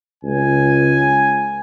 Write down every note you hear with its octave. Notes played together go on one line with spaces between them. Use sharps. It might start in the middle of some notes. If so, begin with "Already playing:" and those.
C#2 G#5